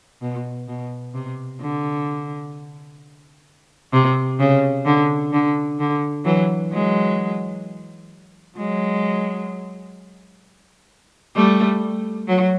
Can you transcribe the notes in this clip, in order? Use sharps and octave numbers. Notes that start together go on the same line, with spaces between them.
B2
B2
C3
D3
C3
C#3
D3
D3
D3
E3 F#3
F#3 G#3
F#3 G#3
G3 A3
F#3